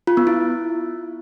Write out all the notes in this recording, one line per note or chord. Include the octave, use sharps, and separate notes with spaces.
F4
B3
E4